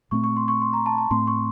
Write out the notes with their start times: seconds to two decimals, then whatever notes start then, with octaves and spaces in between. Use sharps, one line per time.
0.11 A#2 A3 C4 C#6
0.24 C#6
0.37 C6
0.48 C#6
0.61 C6
0.73 A#5
0.86 A5
0.98 A5
1.11 A2 A3 C4 C6
1.27 C#6